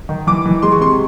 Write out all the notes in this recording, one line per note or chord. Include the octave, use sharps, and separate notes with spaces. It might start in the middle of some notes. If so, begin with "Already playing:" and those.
D#3
E3 D6
E3
G#3 C6
C#6
C3 C6